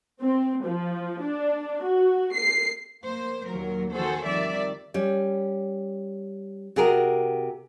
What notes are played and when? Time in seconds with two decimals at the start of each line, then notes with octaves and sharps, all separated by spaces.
0.22 C4
0.65 F3
1.22 D4
1.84 F#4
2.34 C7
3.04 A#3 C5
3.48 D#2 A#2 F#3 A#4
3.91 D#3 F#4 G#4 A4 C5
4.26 F2 D#3 G3 D5 E5
4.94 G3 C#4
6.76 C3 F#4 G#4 A#4